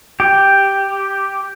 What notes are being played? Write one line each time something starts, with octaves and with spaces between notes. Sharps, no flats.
G4